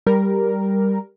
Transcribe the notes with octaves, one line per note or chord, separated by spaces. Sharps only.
G3 A#4